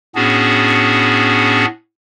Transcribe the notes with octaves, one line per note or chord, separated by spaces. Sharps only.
A2 B3 C#4 D4 F#4 G#4